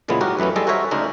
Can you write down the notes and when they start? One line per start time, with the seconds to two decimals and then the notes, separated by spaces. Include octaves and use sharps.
0.08 F2 A#2 C#3 E3 G#3 B3
0.21 G#2 F#3 F#4 G4 A#4 D#5
0.39 F#2 E3 A3 B3 C#4
0.56 G3 G#3 G#4 A4 D#5
0.67 F#4 A#4 C5 C#5 E5 G#5
0.91 D2 C#3 G#3 D4 D#4 A#4